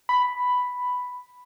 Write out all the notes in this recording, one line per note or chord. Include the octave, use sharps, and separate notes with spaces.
B5